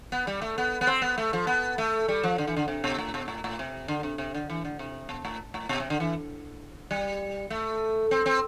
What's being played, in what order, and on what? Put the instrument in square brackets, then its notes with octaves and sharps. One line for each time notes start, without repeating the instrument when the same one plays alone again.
[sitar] B3
G3
A3
B3
B3
C4
B3
A3
F3
B3
A3
G3
F3
D3
E3
D3
C3
B2
A2
B2
A2
A2
C3
D3
C3
C3
D3
E3
D3
C3
B2
A2
A2
B2
C3
D3
E3
G3
A3
C4
C4